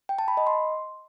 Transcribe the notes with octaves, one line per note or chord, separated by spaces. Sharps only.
G5
A5
B5
D#5
C6